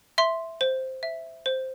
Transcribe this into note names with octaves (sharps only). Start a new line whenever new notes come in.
E5 C6
C5
E5
C5